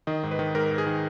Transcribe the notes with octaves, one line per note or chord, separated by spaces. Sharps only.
D#3 D#5
G#2
B4
D#3
G#2 A#4
G#2
G#4
D#3